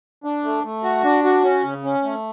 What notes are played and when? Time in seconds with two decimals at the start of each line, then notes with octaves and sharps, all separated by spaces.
0.24 D4
0.44 A3
0.64 A3
0.83 F#4
1.04 D4
1.24 F#4
1.43 C#4
1.64 C#3
1.84 C#4
2.03 A3